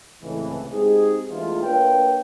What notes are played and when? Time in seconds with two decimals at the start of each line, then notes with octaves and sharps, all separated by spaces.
0.22 C#2 A2 C3 E3
0.71 G#3 C4 D#4 G4 G#4
1.31 E2 G#3 A3 D4 F4
1.62 A#3 D4 B4 C#5 F5 G5